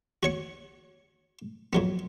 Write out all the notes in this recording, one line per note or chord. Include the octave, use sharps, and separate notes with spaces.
F#4 C#5 C#6
F2 F#3 B3